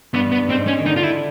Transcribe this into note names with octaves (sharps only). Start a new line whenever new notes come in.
G2 B3
B3
G#2 C4
C#4
D#3
D3 D#4
F4
E4